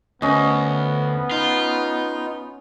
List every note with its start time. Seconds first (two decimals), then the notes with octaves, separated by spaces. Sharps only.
0.22 D2 B3 C#4 D#5
1.31 D#4 F4